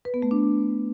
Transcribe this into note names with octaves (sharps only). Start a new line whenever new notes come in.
B4
B3
A3
D4